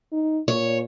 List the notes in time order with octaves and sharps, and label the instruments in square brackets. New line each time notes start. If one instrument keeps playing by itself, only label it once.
[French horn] D#4
[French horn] A#2 [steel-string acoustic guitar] C#5